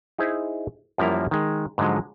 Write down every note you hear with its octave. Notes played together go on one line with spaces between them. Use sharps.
D#4 E4 G#4 C5
F#2 F3 G3 A#3 E4 A#5
D#3 G#3
G#2 D3 F3 F#3 G#3